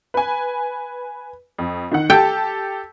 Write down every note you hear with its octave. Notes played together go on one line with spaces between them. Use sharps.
B4 G#5
F2
D#3 F#5
G4 A4 G5 A5